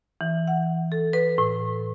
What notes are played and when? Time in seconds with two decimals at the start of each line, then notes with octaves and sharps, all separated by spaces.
0.21 E3
0.47 F#5
0.92 A4
1.13 B4
1.38 A2